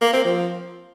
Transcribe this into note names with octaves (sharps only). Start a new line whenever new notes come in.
A#3
C4
F3